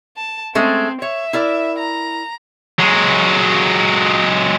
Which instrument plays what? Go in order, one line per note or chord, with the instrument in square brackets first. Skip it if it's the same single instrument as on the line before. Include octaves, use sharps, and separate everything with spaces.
[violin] A5
[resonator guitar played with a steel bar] G#3 A3 C#4 [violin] C4
[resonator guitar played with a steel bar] C#5 [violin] E5
[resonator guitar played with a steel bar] E4 A#4 D5
[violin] A#5
[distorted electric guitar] F#3 G#3